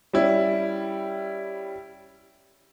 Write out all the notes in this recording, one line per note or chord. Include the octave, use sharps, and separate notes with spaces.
G3 C#4 E4